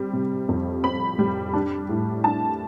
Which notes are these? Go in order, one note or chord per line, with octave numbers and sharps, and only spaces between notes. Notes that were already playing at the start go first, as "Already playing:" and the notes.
Already playing: G3 C4
C3
F2
C4 B5
G3
D4
A2
D4 A5